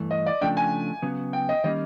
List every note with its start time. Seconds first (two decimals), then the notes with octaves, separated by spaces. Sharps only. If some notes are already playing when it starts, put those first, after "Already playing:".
Already playing: G2 E3 A3
0.11 D#5
0.26 D5
0.41 C#3 F3 A3 D4 G5
0.57 G#5
1.02 C#3 F#3 B3
1.33 G5
1.49 D#5
1.64 D#3 G3 A#3 C#4 D#5